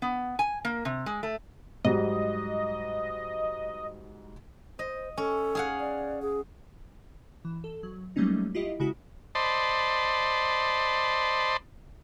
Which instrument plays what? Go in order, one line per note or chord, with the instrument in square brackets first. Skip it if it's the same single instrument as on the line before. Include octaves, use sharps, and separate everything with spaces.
[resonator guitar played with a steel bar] B3
G#5
A#3
C3
G#3
A3
[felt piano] G#2 F#3 G3 [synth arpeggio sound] D#5
[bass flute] C5 [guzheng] D#5
[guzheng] C#4 [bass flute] A4
[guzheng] G#4 F5 F#5
[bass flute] D5
G#4
[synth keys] E3
A4
F#3
F#3 G3 A3 A#3 C#4 D#4
E4 F4 G4 D#5
C#3 G#3 E4 F#4
[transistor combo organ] C5 D5 D#5 A5 B5 C6